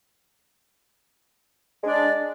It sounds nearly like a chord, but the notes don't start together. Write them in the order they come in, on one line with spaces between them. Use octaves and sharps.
G#3 D4 D5